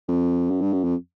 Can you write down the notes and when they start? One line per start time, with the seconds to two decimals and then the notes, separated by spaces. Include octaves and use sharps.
0.08 F2
0.50 F#2
0.61 G2
0.73 F#2
0.84 F2